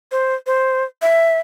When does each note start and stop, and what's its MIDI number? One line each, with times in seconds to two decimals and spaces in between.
0.12 0.35 72
0.47 0.84 72
1.02 1.40 76